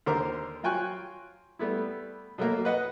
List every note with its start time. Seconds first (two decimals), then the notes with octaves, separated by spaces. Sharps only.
0.06 D#2 D3 A#4 C5 D6
0.63 F#3 F4 G5 G#5 C#6 F#6
1.59 G3 A3 B3 E4
2.38 B2 F#3 A3 A#3
2.65 B4 D#5 F#5